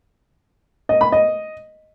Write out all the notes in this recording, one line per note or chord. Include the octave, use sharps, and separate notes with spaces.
D#5
B5
D#5